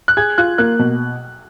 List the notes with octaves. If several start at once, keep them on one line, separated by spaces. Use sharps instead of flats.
F#6
G#4 G#6
F4 F#6
A#3 F#6
B2